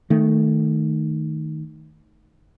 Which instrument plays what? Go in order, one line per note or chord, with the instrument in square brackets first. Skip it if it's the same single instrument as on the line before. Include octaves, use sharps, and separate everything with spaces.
[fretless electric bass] D#3 A3